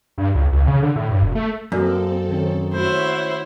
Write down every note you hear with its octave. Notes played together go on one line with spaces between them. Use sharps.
G2
C#2
C#2
C#3
D3
A2
G2
E1
A3
F#2 A#3 C4 A4 D5 D#5
D#3 C#4 D#4
A3 E4 F#4 C5 C#5 E5 F#5